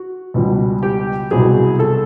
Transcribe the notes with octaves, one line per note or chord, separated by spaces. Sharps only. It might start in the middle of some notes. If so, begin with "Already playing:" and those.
Already playing: F#4
C#2 B2 G3
G4
C2 B2 F#3 G#4
A4